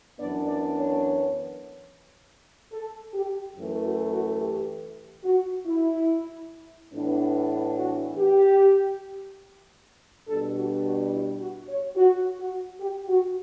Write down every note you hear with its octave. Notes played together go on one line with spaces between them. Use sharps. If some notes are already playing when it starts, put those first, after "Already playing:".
F#2 E3 B3 D4 D5
D5
C#5
A4
G4
F#2 E3 A3
F#4
F#4
G4
F#4
E4
A2 E3 B3 D4
F#4
G4
B2 G3 D4 A4
F#4
F#4
E4
F#4
C#5
F#4
F#4
G4
F#4